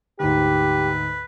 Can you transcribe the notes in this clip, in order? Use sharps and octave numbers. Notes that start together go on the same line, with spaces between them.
D2 G#2 G4 B4